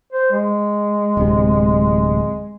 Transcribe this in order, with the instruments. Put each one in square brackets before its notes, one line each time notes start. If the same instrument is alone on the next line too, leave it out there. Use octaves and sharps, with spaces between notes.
[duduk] C5
G#3
[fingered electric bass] D1 C3